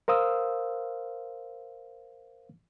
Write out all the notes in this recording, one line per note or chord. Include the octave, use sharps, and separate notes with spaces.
A#4 C5 F5 D#6 E6